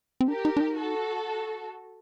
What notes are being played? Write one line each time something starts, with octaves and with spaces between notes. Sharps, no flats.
C4
D4 G4 A#4
D#4
D4
D#4
F#4 A4